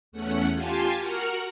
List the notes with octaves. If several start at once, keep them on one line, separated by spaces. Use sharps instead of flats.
E2 A3 C#4 F#5
F4 G4 F5 G#5 A5 C6
F#4 A#4 F#5 F6 F#6